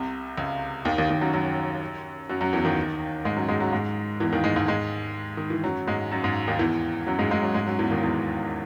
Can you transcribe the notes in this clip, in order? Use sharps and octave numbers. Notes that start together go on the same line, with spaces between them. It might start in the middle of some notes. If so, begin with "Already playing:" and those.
Already playing: C2 C3
C#2 C#3
D#2 D#3
D#2 D#3
D#2 D#3
F#2 F#3
F#2 F#3
F#2 F#3
F#2 F#3
E2 E3
D#2 D#3
G#2 G#3
F#2 F#3
G#2 G#3
F#2 F#3
G#2 G#3
E2 E3
D#2 D#3
G#2 G#3
G#2 G#3
G#2 G#3
D#3
E3
F#2 F#3
G#2 G#3
F#2 F#3
G#2 G#3
D#2 D#3
E2 E3
F#2 F#3
G#2 G#3
G#2 G#3
F#2 F#3
G#2 G#3
F#2 F#3
E2 E3
D#2 D#3
E2 E3